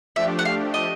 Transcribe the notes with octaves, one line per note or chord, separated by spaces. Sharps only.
F3 A3 D4 G4 E5
F#5
F5
D#5